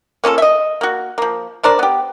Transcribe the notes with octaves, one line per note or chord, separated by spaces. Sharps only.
A#3 C#4 F4 A4
D#5 E5
A#3 F#4
F3 A#3
D4 A#4 C5 D5
B3 G4